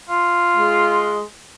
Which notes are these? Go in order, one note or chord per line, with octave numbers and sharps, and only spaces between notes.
F4
G#3